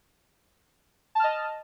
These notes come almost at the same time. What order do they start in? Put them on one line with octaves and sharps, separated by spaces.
A5 F6 D#5